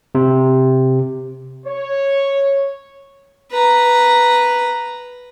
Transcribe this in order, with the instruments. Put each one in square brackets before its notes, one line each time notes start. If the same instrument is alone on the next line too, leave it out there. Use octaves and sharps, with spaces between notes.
[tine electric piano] C3
[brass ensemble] C#5
[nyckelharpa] B4 A#5